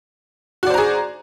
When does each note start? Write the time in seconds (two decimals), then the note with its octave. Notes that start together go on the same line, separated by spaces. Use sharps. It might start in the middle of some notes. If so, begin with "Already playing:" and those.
0.63 F#4
0.67 D5
0.70 C5
0.74 A#5
0.78 G#4